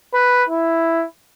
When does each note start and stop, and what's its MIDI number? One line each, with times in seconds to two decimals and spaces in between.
0.14 0.44 71
0.49 1.05 64